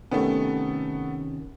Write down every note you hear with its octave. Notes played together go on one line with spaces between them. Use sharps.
C3 D#3 A3 B3 C#4